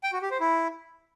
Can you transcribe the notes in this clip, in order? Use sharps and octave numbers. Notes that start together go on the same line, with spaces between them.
G5
F#4
G4
C5
E4